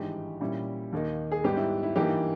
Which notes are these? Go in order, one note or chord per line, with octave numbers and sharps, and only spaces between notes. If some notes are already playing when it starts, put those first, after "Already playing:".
Already playing: G#1 G2 E3 G#3 D#4 G4
A#2 G3 C#4 E4
D#2 D#3 A#3 D#4
G#4
G#2 G3 B3 D#4 G4
E4
E4
G2 E3 A#3 D#4 G4